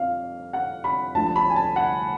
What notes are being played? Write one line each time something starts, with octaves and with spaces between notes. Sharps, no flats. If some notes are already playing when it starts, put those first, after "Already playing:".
Already playing: F2 F5
F#5
B5
D2 D3 F3 A5
A5
B5
G#5
A5
F#5